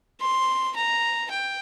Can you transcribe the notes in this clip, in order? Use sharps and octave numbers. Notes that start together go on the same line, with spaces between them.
C6
A#5
G5